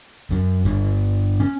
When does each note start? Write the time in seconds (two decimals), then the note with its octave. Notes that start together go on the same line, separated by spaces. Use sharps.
0.31 F#2
0.65 G1
1.40 C#4